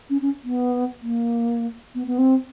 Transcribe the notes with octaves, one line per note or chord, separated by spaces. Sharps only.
C#4
C#4
B3
A#3
B3
B3
C4